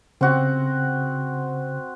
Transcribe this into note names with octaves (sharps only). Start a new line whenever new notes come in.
C#3 C4 F#4